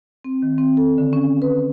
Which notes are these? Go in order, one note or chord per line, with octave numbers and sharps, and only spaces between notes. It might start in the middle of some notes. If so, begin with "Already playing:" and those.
C4
D#3
C4
A4
D3
C#4
B4